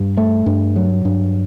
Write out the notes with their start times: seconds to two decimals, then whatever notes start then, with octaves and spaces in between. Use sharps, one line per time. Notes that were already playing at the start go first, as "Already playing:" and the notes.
Already playing: G2
0.17 A3
0.46 G2
0.76 F#3
1.05 G2